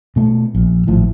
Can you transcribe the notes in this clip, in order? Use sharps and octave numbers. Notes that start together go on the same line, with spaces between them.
B2 A3
A#1
G#1 A2 F3